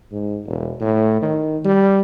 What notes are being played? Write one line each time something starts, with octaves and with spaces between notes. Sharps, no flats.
G#2
E1
A2
D#3
G3